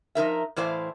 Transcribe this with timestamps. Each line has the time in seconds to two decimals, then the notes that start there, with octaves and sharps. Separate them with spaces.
0.15 F3 D#4 A#4 E5
0.56 A2 E3 E4 C5 D5 F5